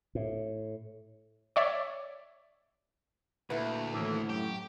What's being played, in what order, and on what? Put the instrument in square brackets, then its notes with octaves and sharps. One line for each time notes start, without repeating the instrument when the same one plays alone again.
[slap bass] A2
[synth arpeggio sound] C#5 D5 E5
[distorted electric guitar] D2 [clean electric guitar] A#2 [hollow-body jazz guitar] E4 B4
[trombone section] A2 [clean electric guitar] D#3 E3 A#3
[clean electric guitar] F#2 [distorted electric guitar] G4